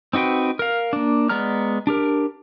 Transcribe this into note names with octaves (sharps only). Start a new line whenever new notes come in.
C4 D#4 F#4 B4 G5
A#4 F5
A#3 D4
G#3 B3 D5 A#5 F6
D4 G4 A#4